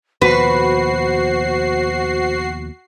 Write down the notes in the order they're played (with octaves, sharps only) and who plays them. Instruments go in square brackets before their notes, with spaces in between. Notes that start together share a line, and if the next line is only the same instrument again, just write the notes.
[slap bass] D#2 B2 F3 [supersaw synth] F#4 C7 [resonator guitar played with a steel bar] B4 [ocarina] C5